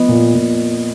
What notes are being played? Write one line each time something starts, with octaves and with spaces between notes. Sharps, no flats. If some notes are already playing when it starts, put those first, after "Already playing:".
Already playing: F3 B3 D#5
A#2
A#2